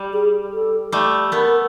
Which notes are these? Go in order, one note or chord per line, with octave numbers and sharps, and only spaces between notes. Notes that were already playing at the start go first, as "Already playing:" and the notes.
Already playing: G3
G#4
A4
G3 A3
A3 B3 A#4